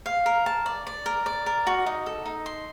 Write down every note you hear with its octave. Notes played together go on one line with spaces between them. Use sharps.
F5
A#4
A5
D5
D5
A#4
D5
A#4
F#4
D#4
A4
D#4
C6